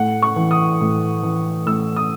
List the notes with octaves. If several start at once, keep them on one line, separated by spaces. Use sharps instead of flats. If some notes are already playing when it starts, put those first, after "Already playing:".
Already playing: A2 F#5
C#6
E3
D#6
A2
E3
A2 E6
D#6